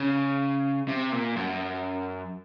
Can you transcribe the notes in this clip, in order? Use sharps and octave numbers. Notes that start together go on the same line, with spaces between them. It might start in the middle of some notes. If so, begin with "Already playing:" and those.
Already playing: C#3
C3
A#2
F#2